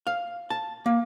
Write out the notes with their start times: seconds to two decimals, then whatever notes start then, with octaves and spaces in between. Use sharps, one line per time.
0.07 F5
0.50 A5
0.86 A#3